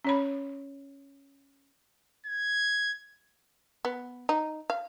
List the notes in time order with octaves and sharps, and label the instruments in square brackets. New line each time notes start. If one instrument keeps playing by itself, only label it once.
[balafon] C#4 C#5 B5
[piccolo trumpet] G#6
[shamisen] B3
D#4
F5